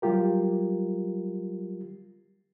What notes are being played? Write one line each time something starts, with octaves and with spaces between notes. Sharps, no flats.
F#3 G3 F4 G4 A#4